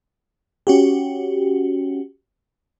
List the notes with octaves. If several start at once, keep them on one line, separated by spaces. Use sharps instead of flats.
C#4 F#4 G4